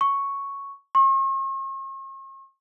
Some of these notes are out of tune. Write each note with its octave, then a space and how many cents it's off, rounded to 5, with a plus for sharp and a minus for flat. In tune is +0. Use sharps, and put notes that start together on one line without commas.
C#6 +0
C#6 -45